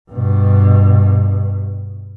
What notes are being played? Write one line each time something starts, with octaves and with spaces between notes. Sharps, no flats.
G2 B2